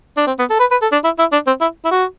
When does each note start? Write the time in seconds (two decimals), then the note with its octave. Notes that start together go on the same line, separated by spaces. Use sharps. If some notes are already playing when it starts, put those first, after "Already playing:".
0.17 D4
0.27 C4
0.39 B3
0.50 A4
0.60 B4
0.71 B4
0.82 A4
0.92 D4
1.04 E4
1.19 E4
1.32 D4
1.47 C4
1.61 E4
1.85 E4
1.91 F#4